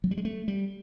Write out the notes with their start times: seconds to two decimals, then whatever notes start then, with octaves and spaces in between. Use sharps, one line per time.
0.04 F#3
0.11 G3
0.17 G#3
0.25 A3
0.48 G3